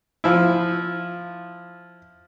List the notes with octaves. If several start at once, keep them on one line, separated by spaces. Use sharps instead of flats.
F3 E4